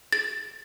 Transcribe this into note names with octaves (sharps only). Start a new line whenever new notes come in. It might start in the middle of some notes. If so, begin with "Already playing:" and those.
A6